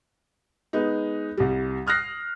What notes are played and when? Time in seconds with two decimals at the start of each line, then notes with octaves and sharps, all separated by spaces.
0.73 G#3 B3 D#4
1.37 C2 G3
1.87 D#6 F6 F#6 A#6 C7